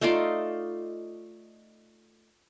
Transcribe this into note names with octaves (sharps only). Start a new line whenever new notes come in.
A3 D#4 F4 D5